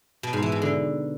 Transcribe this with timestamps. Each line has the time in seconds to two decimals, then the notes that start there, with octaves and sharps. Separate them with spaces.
0.23 B2
0.33 G#2
0.42 E3
0.52 B2
0.62 D3